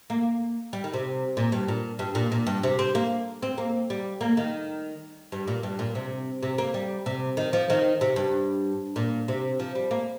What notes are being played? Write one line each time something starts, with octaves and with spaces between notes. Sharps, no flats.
A#3
G3
D#3
C3
A#2
G2
A#2
G2
A#2
A#2
G2
C3
C4
A#3
C4
A#3
G3
A#3
D#3
G2
A#2
G2
A#2
C3
C3
A#3
G3
C3
D#3
F3
D#3
C3
G2
A#2
C3
F3
G3
A#3